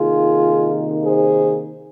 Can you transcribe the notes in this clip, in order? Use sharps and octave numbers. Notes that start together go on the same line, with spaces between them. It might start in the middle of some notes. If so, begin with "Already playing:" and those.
Already playing: C3 D#3 A#3 D#4 F4 G#4
G#4 C5